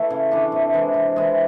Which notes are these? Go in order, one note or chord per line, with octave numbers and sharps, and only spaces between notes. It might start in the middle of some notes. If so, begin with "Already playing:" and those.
Already playing: E3 A3
C#3
E3 A3 D4
C3
E3 G#3
C3
E3 G#3